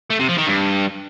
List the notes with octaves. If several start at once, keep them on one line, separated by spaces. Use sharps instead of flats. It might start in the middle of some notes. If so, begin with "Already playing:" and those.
A3
C3
F3
D#3
G2